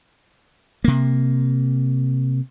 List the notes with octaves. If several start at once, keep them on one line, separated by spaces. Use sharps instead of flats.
C3 A#3